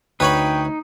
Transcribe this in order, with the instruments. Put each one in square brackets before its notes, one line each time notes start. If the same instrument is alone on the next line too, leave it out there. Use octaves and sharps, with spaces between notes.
[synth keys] D2 [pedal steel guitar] D#4 [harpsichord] B4 C#5 B5 [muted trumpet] G5